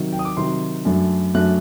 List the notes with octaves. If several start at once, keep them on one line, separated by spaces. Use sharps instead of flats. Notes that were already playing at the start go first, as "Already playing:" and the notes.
Already playing: C3 D#3 F#3
G5
D#6
D6
C3 D#3 F#3 C6
F#2 F#3 A3 D4
F#2 F#3 A3 D4 F#6